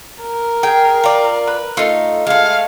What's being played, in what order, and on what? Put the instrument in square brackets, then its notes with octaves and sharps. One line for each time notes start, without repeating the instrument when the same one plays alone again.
[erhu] A#4
[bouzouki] G#4 [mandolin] G5
[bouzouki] F4 D5
[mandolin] B4
[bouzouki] A3 D#4 [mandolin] F4
[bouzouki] G#3 A3 [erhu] F5